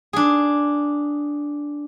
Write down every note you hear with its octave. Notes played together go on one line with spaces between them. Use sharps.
D4 G#4